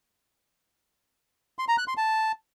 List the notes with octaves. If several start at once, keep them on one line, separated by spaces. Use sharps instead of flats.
C6
A#5
F#6
C6
A5